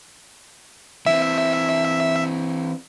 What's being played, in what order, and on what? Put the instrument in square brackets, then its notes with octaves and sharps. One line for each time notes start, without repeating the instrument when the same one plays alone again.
[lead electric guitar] E3 C4 [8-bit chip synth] E5